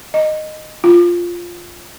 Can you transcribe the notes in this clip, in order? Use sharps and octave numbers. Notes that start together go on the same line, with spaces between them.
D#5
F4